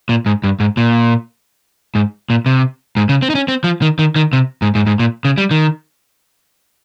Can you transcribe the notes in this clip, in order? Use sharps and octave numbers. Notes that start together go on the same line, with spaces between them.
A#2
G#2
G2
G#2
A#2
G#2
A#2
C3
G#2
C#3
C4
D#4
C#4
C4
F3
D#3
D#3
D#3
C3
G#2
G#2
G#2
A#2
C#3
G3
D#3